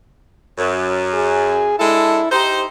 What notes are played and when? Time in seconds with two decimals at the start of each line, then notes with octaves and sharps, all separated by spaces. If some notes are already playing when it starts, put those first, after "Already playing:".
0.58 F#2
1.14 G#4
1.79 G#3 D4 E4 A4
2.32 D#4 G4 C5